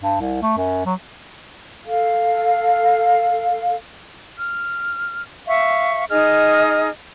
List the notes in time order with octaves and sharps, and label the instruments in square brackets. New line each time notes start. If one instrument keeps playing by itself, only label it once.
[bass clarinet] G2
C2
A3
F#2
F#3
[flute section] A4 F5
F6
E5 F5 C#6
D#4 G#4 D#5 F6